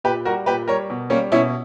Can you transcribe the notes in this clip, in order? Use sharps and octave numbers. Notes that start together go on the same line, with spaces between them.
A#2 G4 B4
G3 F#4 A#4
A#2 G4 B4
G3 A#4 C#5
B2
G3 A#3 C#4
B2 C#4 E4